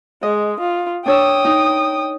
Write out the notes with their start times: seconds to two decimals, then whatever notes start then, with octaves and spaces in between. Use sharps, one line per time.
0.23 G#3 D#5
0.60 F4
1.06 D4 C#5 G5 D#6 E6
1.45 D#4